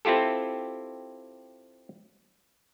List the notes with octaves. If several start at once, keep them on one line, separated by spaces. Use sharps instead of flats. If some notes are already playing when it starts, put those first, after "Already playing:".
C4 E4 F4 G4 A4